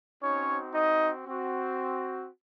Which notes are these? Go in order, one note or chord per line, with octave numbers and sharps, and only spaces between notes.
C4 C#4 D#4 F#4 C#5
D#4 D#5
C4 F#4